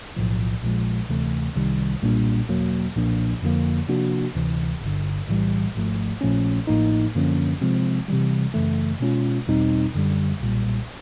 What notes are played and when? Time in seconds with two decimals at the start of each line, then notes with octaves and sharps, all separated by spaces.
0.16 B1 A2 F3
0.63 A#1 A#2 F3 G#3
1.10 D2 C3 E3 A3
1.56 C2 C3 D#3 G3
2.02 B1 A#2 G3 A#3 D4
2.49 E2 B2 F#3 A#3
2.96 B1 A#2 F3 A#3 D4
3.42 F2 D3 F3 A#3
3.89 C3 F3 A#3 D4 F#4
4.35 D2 C3 E3
4.82 G1 G2 D3
5.28 B1 A2 E3 G3
5.75 G#1 G#2 F3 A3
6.21 A#1 A#2 F3 A3 C#4
6.67 A1 A2 F3 A#3 D#4
7.15 F#2 D3 F3 A#3 C#4
7.61 C3 F3 G#3 C4
8.08 C3 E3 G3
8.54 F#2 C#3 E3 A3
9.00 B2 G#3 C#4 F4
9.47 E2 B2 G3 C4 D#4
9.94 F#2 D3 G3
10.40 B1 A#2 G3